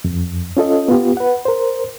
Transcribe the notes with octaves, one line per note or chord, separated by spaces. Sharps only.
F2
C#4 F4 A4 D#5
B3 F4 G4
B4 F#5
A#4 C5